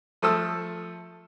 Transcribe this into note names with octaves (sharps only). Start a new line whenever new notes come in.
F3 A3 A4 D#6 E6